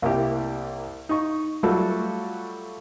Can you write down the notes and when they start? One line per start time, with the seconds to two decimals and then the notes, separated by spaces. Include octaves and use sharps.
0.02 C2 A#3 E4 G4
1.09 D#4 C#6
1.63 F#3 G3 A3 F4 F#4 A4